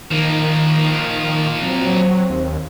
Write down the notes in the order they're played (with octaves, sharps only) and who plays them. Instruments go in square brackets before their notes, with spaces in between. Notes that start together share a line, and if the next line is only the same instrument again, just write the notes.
[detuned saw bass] D#3 [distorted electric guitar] F3 A#3
[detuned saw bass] F#3 [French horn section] C4
[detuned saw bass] D#2